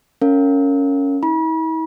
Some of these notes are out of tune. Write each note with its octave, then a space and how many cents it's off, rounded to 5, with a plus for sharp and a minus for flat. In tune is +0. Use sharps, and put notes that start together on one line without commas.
C#4 +5 A#4 -25 F5 +0
E4 -45 B5 -40